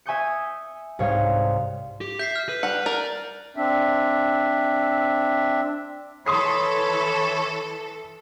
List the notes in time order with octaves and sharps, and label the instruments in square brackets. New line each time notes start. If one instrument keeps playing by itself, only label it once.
[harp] E5 G#5 C#6 D#6 G6 C#7
C2 G#2 C#5 F5
[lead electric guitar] G4
[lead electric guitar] E5 [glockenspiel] G6 B6 C7
[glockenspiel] F6
[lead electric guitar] B4
[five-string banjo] G3 F#5
[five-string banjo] A#4 [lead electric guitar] D5
[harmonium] C4 D4 E5
[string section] E3 A4 [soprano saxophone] C#5 [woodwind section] B5 [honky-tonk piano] C6 D#6 C7